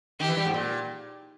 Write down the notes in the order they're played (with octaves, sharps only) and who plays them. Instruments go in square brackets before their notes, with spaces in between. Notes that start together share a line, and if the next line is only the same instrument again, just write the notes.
[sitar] D#3 [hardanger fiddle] G4
[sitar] E3
G3
G#2
A#2